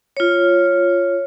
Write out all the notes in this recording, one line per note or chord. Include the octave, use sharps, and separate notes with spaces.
F4 C#5